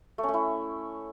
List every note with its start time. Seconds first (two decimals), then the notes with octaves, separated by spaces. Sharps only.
0.18 A3
0.23 C#4
0.29 A3
0.34 E4